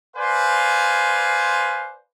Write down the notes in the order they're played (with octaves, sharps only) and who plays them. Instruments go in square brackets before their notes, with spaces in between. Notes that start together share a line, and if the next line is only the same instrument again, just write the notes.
[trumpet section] B4 C5 D5 F5 G#5 C6